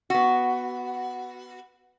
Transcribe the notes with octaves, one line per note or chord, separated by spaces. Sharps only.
B3 F#4